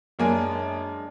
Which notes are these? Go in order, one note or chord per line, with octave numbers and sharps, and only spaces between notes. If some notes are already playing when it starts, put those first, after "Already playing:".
F#2 G#3 A#3 D4 G#5